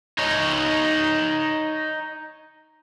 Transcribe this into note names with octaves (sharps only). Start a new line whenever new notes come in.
D#4 C#5